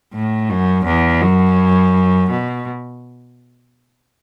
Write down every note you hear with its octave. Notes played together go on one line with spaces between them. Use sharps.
A2
F#2
E2
F#2
B2